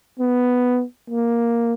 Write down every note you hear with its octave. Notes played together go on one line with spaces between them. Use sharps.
B3
A#3